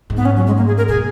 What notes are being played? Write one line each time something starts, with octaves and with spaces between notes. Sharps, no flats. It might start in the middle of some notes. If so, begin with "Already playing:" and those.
G#2
B3
C#4
F#3
G#3
A#3
G#4
A#4
B2 G#4